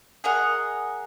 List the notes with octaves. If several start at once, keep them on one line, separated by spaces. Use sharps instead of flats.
G#4 A#4 D#5 F#5